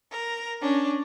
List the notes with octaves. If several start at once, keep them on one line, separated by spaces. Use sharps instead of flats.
A#4
C#4 D4